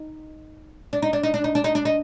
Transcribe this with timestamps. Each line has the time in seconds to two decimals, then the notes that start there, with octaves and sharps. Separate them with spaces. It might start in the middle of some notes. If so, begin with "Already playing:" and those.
Already playing: D#4
0.93 D4
1.02 D#4
1.13 D4
1.23 D#4
1.34 D4
1.44 D#4
1.55 D4
1.64 D#4
1.75 D4
1.85 D#4